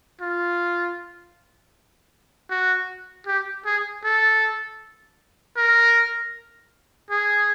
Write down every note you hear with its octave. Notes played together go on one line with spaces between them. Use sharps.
F4
F#4
G4
G#4
A4
A#4
G#4